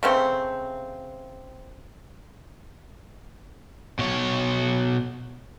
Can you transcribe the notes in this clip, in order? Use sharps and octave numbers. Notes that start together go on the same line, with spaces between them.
C#3 A3 C4
B2 C#5